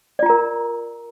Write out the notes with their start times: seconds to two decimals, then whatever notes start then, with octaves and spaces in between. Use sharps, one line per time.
0.19 D5
0.23 F4
0.26 A#5
0.30 A#4